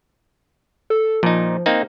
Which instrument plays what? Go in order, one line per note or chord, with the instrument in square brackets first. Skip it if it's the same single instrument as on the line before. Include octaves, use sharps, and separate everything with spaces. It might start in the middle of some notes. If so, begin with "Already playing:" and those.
[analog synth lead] A4
[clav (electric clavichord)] A#2 D#4 [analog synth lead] F3
[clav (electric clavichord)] A#3 C4 D#4